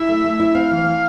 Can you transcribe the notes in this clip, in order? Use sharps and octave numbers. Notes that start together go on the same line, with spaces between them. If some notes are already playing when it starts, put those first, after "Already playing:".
Already playing: E4 E5
A3
A3
E4
C4 F5
E3
C4